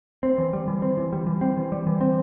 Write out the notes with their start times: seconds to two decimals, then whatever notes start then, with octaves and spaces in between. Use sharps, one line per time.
0.23 C4
0.38 E3
0.53 G3
0.68 E3
0.82 C4
0.97 E3
1.13 G3
1.27 E3
1.41 C4
1.57 E3
1.72 G3
1.87 E3
2.01 C4